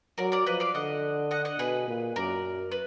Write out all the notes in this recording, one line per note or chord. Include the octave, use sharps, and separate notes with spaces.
F#3 A#4 D5
A#4 D5
F3 B4 D#5
D5 F5
D3 D#5 F#5
D#5 F#5
D#5 F#5
B2 G#4 B4
A#2
F#2 A#4 D5
B4